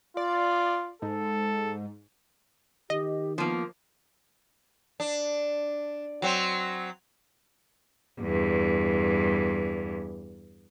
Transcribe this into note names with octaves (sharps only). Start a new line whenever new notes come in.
F4 D5
G#2 A4
D#3 G4 D#5
F3 A#3 B3
D4
F#3 C4
E2 G2